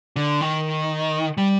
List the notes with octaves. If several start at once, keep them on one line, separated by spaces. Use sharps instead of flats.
D3
D#3
G3